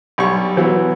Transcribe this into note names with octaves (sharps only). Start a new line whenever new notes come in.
B1 G3 C#6
E3 F#3 B3